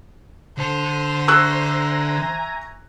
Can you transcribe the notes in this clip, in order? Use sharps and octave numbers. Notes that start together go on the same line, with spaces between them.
D3 C5 A5
E5 G#5 A#5 C#6 E6 F#6